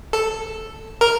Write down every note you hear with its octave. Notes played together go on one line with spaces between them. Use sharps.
A4
A#4